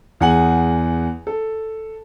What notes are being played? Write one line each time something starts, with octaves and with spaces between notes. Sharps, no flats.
E2 G#4 F#5 G#5 F#7
A4